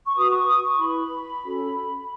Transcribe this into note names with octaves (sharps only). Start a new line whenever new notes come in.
C#6
F#4 B4 D#6
C#6
D#6
C#6
E4 B4 B5
C#4 F#4 A4 C#5